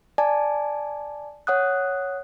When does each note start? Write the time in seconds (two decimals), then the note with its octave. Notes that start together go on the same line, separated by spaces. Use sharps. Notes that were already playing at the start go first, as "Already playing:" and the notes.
0.18 D5 G#5 A5
1.47 C#5 F#5 D#6 F#6